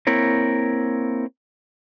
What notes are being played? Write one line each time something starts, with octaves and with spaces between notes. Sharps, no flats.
A#3 C4 E4 A#4 C#5